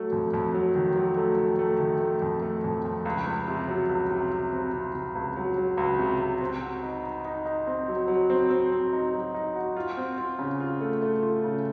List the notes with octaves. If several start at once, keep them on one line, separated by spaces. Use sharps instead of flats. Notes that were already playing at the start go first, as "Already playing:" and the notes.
Already playing: F#3 A3
F2
F2
F#3
D#3
F#3
A3
D#3
A3
D#3
A3
F2
A3
F2
F2
C#2
C#2
C3
F#3
C#2
C3
C3
C4
C3
C3
C#2
F#3
F#3
C#2
C3
C#2
C4
F#4
D#4
D#4
D#4
D#4
C4
F#3
F#3
C4
C4
C4
D#4
F#3
D#4
F#4
F4
C4
F4
C#3
F4
A3
A3
F4
C#3